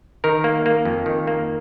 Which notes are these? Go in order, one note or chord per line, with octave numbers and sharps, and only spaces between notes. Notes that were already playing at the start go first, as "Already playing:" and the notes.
D#3 A#4
A#3
A#3
F2
D#3
A#3